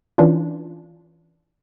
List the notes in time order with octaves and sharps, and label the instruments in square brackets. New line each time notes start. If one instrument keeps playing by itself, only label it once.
[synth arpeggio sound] E3 C#4 D4 F4